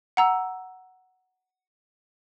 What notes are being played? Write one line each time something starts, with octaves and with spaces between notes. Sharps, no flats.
F#5 A#5 E6